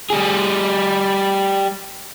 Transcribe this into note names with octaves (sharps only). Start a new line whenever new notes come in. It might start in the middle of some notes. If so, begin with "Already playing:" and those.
G3 G#4